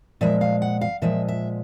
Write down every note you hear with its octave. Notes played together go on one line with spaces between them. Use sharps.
A#2 F3 G#3 E5
F5
F#5
F5
A#2 F3 G#3 E5
E5